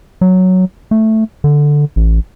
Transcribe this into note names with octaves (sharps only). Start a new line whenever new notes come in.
F#3
A3
D3
A1